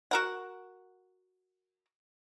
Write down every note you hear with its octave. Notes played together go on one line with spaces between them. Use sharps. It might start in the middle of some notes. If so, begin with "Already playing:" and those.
F#4 A#4 F#5